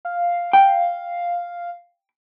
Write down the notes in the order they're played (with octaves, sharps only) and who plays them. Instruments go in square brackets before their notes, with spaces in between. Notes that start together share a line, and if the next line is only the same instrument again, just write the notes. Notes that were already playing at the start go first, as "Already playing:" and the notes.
[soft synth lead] F5
[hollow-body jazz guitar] G5